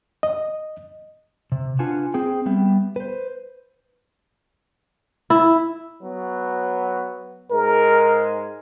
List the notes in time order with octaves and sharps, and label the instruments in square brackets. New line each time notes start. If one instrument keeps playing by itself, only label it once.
[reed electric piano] D#5
[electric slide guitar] C3
D4 F4 B4 F#5 G#5 A5
C4 G#4 G5
G3 B3 E5 G5
B4 C5
[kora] E4
[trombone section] F#3 B3
[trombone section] G#2 G#3 [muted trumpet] A#4